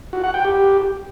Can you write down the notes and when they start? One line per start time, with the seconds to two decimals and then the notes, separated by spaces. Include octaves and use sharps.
0.13 F#4
0.23 F#5
0.34 G5
0.45 G4